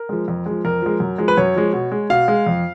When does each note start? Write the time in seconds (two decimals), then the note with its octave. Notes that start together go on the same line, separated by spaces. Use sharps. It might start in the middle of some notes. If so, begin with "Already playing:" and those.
Already playing: A#4
0.09 F3 G#3
0.28 F2
0.46 F3 G#3
0.65 F2 A#4
0.82 F3 G#3
1.00 F#2
1.18 F3 G#3
1.28 B4
1.37 F#2 C#5
1.56 F3 G#3
1.73 B2
1.91 G#3
2.10 B2 F5
2.28 G#3
2.46 F2